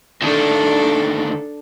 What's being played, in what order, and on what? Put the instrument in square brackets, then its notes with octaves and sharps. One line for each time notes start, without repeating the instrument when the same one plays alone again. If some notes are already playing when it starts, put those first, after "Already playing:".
[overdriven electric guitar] D2 D#3 [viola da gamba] D4 A4